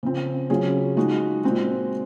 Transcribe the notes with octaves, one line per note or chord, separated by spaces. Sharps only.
C#3 F3 C4
C#3 F#3 C#4 F4 G#4
F3 G#3 D#4 F#4
A#2 G#3 C4 F#4